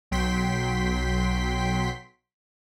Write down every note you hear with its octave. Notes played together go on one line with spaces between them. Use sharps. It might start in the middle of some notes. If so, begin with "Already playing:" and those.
B1 F#3 G5 C6 B6